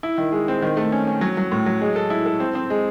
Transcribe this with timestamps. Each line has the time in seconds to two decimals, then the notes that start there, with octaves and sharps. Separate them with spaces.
0.03 E4
0.18 D#3
0.32 G#3
0.48 C4
0.62 D#3
0.77 A3
0.92 C#4
1.07 C#4
1.21 F#3
1.37 F#3
1.52 A2
1.66 F#3
1.81 G#3
1.96 A4
2.10 E4
2.26 A4
2.40 C4
2.55 C4
2.70 G#3